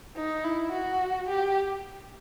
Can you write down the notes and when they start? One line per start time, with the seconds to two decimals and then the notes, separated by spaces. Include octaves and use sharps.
0.16 D#4
0.44 E4
0.72 F#4
1.29 G4